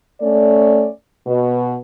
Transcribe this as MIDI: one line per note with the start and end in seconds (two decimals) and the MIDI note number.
0.21 0.88 57
0.21 0.88 61
0.21 0.88 74
1.27 1.76 47